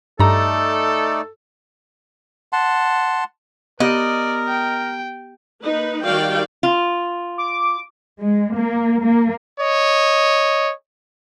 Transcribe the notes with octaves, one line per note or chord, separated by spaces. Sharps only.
G2 A3 D#4 A4 D5 A#5
F#5 A5 C6
B3 G4 A#4 D5 D#5
G5
A#3 D#4 B4
D#3 G3 F#4 D5 F5 G5
F4
D6
G#3
A#3
A#3
C#5 D#5